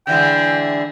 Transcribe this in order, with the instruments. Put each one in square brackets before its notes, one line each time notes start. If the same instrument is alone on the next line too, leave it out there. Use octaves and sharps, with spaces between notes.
[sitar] D3 E3 G#3 [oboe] G5